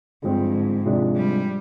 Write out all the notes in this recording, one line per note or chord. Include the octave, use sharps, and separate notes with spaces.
G2 D3 F3 G#3 C4
G#2
C3 F3 G#3 D4
G3